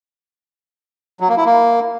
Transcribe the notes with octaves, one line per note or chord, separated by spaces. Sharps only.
F#3
A#3
E4
A#3